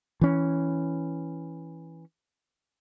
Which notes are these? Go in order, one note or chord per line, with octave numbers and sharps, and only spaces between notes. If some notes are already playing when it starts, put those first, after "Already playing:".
E3 C#4